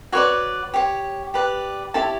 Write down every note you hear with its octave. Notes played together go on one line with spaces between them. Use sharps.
F#4 B4 C#5 D5 C#6
G4 C#5
G4 B4 D5
E4 G4 A4 C#5 A5